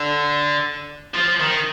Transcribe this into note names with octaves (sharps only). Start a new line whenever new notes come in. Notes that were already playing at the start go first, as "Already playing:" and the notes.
Already playing: D3
F3
D#3